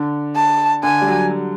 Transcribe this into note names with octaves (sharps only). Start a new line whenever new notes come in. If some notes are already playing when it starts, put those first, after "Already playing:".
Already playing: D3
A5
D3 G#5
G3
F#3
F#3